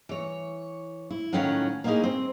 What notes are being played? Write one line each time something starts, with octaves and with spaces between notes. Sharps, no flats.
E3 C#5
E4
A2 D#3 F#3 C#4 F4 F#5
A#3 B3 C#4 D#4 E4 G#4
C4